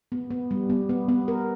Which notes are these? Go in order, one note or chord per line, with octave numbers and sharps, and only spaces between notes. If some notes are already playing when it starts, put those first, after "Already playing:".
B3
B3
G3
B3
B3
B3
A#4